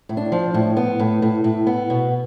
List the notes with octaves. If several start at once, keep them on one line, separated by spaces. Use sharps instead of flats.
A2
D4
F3
A2
B3
A2
A2
A2
B3
B2